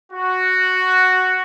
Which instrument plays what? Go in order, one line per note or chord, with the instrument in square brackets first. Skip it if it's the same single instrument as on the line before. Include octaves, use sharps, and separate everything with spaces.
[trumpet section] F#4